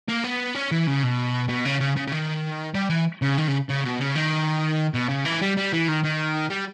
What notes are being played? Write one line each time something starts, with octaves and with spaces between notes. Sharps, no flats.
A#3
B3
C#4
E3
C#3
B2
B2
C#3
C#3
C#3
C#3
D#3
G3
E3
C#3
D#3
C#3
C#3
B2
C#3
D#3
B2
C#3
E3
G3
G3
E3
D#3
D#3
G3